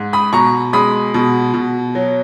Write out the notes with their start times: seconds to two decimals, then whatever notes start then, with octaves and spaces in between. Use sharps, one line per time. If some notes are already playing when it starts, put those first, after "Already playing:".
Already playing: G#2
0.13 B5 D#6
0.33 B2 A#5 C#6
0.73 G#3 B5 D#6
1.14 B2
1.54 B2
1.95 F#3